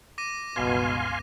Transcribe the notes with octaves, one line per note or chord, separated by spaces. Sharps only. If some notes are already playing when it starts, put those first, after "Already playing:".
D6 A#6 D#7
G1 C#2 B2 B3 F5 G#5 C6